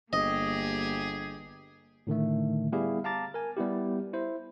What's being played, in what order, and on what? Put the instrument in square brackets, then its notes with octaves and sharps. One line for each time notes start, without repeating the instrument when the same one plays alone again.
[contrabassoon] G1 [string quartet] A#3 G4 [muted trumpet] G#4 [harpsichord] D#5
[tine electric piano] A2 D3 D#3 A3
G3 B3 E4 G4 G#4 F5
F5 A5 A#5 D6 A6
A#4 G#5
G3 B3 E4 G4
E4 C5